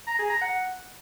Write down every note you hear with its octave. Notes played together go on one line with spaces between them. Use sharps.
A#5
G#4
A#5
F#5